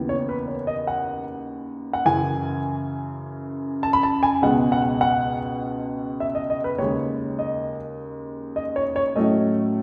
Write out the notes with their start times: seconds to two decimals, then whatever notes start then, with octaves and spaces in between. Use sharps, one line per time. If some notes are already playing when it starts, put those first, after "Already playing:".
Already playing: D#2 C#3 E3 B3
0.09 C#5
0.29 B4
0.48 C#5
0.67 D#5
0.87 F#5
1.93 F#5
2.05 F#2 C#3 E3 G#5
3.83 A5
3.93 B5
4.03 A5
4.23 G#5
4.42 C#2 B2 G#3 B3 F#5
4.72 F#5
5.01 F#5
6.20 E5
6.35 D#5
6.50 D#5
6.64 B4
6.78 D#2 C#3 G#3 C#5
7.39 D#5
8.56 D#5
8.76 C#5
8.96 C#5
9.16 A2 F#3 A3 C#4 D#5